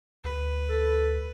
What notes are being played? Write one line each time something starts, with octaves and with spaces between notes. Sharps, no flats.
D2 B4
A4